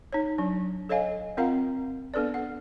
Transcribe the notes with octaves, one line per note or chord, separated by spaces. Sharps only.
D#4 C#5
F#3 D4
A4 C#5 D#5 F5 G#5
C4 F4 A#4 F5 F#5 A#5
B3 D4 A4 B4 D5
F#5